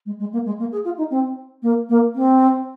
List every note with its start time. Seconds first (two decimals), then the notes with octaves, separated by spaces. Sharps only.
0.05 G#3
0.19 G#3
0.32 A#3
0.45 G#3
0.59 A#3
0.71 G#4
0.84 F4
0.97 D#4
1.10 C4
1.62 A#3
1.89 A#3
2.15 C4